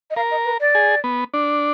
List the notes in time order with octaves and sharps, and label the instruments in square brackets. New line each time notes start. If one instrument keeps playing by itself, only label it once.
[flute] D#5
[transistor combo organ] A#4 [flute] F5
[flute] D#5
B4
D5
[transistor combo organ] G#4
B3
D4